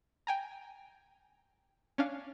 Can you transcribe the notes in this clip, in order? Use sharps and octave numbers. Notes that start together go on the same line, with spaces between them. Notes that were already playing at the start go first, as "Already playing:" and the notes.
G5 G#5 A#5
C#4 D4 F5